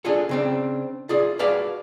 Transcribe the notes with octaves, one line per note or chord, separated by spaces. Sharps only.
D4 F4 G#4 A4
C#3 C4 D4
F4 G#4 D5
F#4 G#4 B4 D5 F5 A5